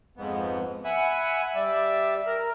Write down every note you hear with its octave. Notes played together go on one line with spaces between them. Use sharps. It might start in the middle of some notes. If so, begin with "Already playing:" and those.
F2 G#2 B3
E5 F#5 G#5 B5
G3 D5 E5
A#4